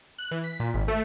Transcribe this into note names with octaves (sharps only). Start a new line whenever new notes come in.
F#6
E3
B6
A#2
G#1
A3